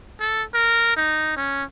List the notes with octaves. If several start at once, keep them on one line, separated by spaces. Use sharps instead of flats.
A4
A#4
D#4
C#4